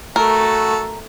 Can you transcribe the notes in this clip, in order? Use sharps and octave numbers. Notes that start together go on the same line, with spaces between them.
A3 F#4 A4 A#4